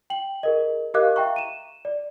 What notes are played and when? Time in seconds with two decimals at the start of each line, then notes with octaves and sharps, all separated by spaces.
0.10 G5 F#7
0.43 G#4 A#4 D#5
0.94 G4 A#4 D#5 F5 D6 F#6
1.16 E5 F5 G5 A#5 C#6
1.36 D#7 E7
1.85 D5